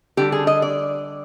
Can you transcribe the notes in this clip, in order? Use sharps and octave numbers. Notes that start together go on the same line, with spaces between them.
D3 G3 G4
G#4
D#5
D5